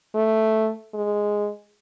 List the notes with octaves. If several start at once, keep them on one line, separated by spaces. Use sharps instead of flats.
A3
G#3